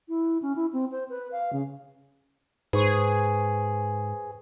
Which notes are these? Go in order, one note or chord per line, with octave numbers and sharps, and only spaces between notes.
E4
C#4
E4
C4
C5
B4
F5
C#3
G#2 G#4 B4 C5 C#6